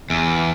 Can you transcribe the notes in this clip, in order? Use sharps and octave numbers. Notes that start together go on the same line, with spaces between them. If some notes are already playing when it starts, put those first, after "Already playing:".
E2